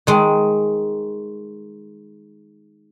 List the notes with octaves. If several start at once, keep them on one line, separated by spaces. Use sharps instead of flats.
D#3 G#3